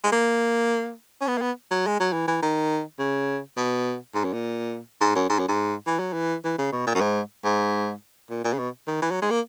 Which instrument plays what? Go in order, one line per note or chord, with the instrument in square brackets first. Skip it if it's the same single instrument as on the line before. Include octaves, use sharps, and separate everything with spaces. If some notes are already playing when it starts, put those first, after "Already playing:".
[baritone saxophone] G#3
A#3
C#4
B3
A#3
B3
F#3
G#3
F#3
E3
E3
D#3
C#3
B2
G#2
F#2
A#2
G#2
F#2
G#2
F#2
G#2
E3
F#3
E3
E3
C#3
B2
A#2
F#2
G#2
G#2
A#2
A#2
C#3
B2
D#3
E3
F#3
G#3
A#3